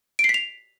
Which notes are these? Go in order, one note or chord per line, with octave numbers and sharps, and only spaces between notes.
D7
C7
B6
F7